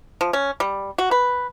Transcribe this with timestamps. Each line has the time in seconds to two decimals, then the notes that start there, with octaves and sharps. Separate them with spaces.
0.21 F3
0.33 C#4
0.60 G3
0.98 F#4
1.11 B4